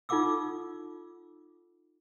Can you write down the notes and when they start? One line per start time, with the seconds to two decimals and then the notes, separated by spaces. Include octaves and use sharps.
0.09 D#4 F4 A4 F#5 D6 E6